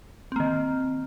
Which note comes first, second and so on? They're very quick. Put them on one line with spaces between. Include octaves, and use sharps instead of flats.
C4 A#3 D#3